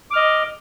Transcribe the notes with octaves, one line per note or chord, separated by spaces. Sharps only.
D#5 D6 F6